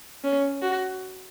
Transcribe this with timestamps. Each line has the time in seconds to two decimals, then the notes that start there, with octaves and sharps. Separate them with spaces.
0.24 C#4
0.62 F#4